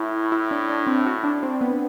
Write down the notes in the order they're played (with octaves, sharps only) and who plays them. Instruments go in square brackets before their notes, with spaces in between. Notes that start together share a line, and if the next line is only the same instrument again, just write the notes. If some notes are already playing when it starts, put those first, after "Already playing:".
Already playing: [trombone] A2 [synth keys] E4
[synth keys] E4
D4
D4
C4
F#4
D4
C4
B3